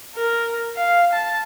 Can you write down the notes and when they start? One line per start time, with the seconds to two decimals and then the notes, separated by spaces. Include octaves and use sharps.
0.15 A#4
0.76 F5
1.13 A5